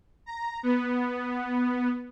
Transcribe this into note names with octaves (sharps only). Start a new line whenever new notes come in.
A#5
B3